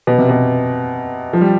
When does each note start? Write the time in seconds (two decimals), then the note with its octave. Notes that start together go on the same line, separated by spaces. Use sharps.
0.07 B2
0.18 C3
0.29 B2
1.33 F3
1.41 G3